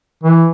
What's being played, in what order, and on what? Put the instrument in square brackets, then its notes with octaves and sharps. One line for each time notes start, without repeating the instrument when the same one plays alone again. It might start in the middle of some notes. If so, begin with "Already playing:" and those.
[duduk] E3